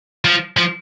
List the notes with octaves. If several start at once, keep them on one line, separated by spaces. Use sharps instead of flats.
F3
F3